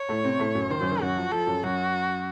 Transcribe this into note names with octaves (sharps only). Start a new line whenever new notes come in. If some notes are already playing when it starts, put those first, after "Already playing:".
Already playing: C#5
A2 A3
C3 C4
A2 A3
F#2 F#3
D#3 C5
F#2 F#3
D#3
F#2 F#3 F#4
F3
F3 A4
F#2 F#3
F#2 F#3 F#4